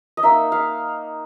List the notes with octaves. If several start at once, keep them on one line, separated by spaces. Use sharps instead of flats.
D#5
A#3 D#4 E5
F5